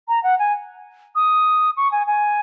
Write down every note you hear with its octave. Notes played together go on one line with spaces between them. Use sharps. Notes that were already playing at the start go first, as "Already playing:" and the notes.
A#5
F#5
G#5
D#6
C#6
G#5
G#5